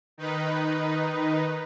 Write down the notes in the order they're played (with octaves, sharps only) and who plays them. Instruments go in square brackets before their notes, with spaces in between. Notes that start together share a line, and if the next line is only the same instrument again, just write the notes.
[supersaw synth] D#3 D#4 B4